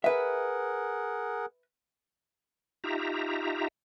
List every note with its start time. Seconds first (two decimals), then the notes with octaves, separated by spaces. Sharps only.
0.04 G#4 A#4 B4 E5 F#5
2.84 D#4 F4 G4 E5 A#5